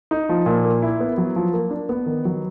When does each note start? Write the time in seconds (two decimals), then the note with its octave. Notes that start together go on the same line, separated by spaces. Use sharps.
0.11 D#4
0.29 F3
0.46 A#2
0.64 A#3
0.82 E4
1.00 B3
1.18 F#3
1.36 F3
1.53 A#3
1.71 D4
1.89 B3
2.06 D#3
2.25 F#3